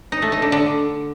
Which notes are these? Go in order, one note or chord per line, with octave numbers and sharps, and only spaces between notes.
D#4
A3
D#4
D3
D3